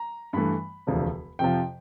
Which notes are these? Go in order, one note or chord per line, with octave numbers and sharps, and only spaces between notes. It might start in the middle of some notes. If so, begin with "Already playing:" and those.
Already playing: A#5
G2 E3 A3 B5
E1 D2 C3 F3
F2 C3 F3 G5